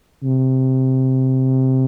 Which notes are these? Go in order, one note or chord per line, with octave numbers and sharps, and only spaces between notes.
C3